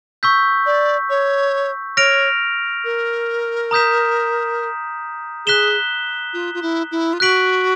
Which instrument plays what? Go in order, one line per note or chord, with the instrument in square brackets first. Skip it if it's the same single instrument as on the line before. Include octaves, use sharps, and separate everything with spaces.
[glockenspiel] C#6 E6 G6 B6
[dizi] D5
C#5
[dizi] C#5 [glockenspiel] F6 A#6 D7 F7
[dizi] A#4
[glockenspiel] A#5 D#6 G6 B6 E7
[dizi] G#4 [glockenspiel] F#6 B6 E7 G7
[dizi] F4
F4
E4
E4
F4
[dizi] F#4 [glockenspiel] F#6 B6 D7 F#7